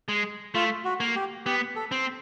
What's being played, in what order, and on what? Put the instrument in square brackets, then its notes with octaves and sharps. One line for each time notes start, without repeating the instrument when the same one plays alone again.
[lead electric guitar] G#3
[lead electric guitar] A3 [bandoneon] F4
[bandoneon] F#4
[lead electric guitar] A#3
[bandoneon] G4
[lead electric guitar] B3 [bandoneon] G4
[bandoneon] A4
[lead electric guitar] C4